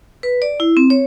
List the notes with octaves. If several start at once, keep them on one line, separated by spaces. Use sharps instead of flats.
B4
D5
E4
C4
C#5